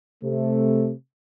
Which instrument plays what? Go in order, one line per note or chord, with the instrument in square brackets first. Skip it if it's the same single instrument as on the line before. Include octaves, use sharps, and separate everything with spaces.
[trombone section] C3 A3